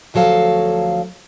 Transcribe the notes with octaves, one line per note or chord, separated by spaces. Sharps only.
D2 F3 F#3 A4 F5